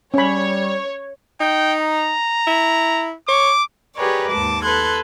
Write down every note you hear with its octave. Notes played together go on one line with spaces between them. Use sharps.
G3 C#4 C#5 B5
D#4 G5
A#5
E4
C#5 D6
G4 G#4 A#4 B4 C#5 D5
D#2 G#2 A5 D6
A4 B4 C6 F#6 G#6